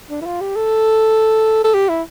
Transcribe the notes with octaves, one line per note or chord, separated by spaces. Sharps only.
D4
E4
F4
G4
A4
A4
G4
E4